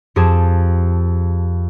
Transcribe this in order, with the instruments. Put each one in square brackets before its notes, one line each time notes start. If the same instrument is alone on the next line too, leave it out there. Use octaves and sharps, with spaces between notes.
[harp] F2 G4 G#4 C5 A5